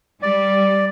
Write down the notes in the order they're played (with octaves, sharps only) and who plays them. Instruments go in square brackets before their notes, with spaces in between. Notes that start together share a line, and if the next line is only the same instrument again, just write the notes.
[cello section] G3 [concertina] D5